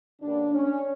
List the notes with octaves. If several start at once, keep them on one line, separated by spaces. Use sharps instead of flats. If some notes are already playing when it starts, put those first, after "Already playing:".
G2 D3 G3 A#3 C#4 D4
C#4